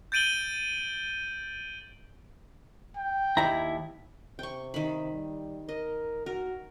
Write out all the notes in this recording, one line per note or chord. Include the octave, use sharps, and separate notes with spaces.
G6 A6 D7 D#7 F#7 G7
G5
D#2 E4 A#5
C3 G5 C#6
D#3 B5
G3
A#4 D#5
F#4 A#4